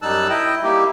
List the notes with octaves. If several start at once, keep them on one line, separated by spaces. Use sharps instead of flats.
F#2 G3 D#4 A5 E6 F#6
E4 D#5 G5
G3 A#3 D#4 E4 G4